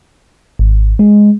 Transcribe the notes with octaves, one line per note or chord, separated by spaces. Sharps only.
G#1
G#3